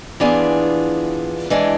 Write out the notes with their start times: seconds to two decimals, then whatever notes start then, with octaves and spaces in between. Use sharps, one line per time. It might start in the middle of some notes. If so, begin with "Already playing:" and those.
0.20 E3 B3 D4 F4 G#4
1.50 E3 G#3 D4